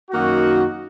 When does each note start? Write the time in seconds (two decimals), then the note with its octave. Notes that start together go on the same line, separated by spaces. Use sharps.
0.10 F#2 D#3 A#3 D#4 F#4